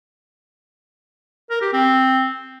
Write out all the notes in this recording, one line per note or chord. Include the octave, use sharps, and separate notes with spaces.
A#4
G4
C4